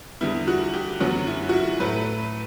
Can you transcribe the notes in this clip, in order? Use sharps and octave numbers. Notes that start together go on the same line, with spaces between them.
E2 D3 G3 B3 E4
F#4
G4
F#2 D3 F#3 B3 F#4
E4
F#4
E4
A2 F#3 A3 B4